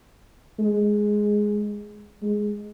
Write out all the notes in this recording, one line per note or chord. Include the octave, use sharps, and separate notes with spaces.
G#3
G#3